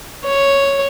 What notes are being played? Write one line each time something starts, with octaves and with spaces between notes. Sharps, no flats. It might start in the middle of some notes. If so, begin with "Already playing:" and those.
C#5